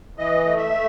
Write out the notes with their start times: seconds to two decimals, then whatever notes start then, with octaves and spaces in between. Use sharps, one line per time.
0.18 E3 D#5
0.45 A3
0.58 E5
0.71 A3